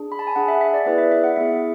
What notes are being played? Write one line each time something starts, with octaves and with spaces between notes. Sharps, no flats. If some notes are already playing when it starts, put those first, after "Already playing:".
Already playing: D4 G#4
B5
A5
G#5
D4 G#4 F#5
E5
F#5
E5
D5
B3 E4 G#4 B4
E5
E5
F#5
B3 E4 G#4 E5